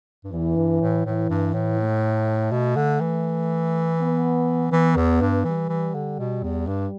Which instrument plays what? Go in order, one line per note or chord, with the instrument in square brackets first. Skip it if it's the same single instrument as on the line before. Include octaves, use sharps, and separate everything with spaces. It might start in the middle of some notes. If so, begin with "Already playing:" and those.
[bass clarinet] G2
[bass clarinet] E2 [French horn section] E3
[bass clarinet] G2
A2
[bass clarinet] A2 [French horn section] E3
[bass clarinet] G2
A2
[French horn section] A3
[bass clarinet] B2
D3
E3
[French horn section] B3
[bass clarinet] E3 [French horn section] B3
[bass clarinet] E2
G2
[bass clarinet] E3 [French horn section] G3
[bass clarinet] E3
D3
B2
E2
G2